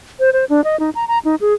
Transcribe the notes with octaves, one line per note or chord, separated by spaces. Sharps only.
C5
C5
D4
D#5
D#4
A#5
A#5
D#4
G#4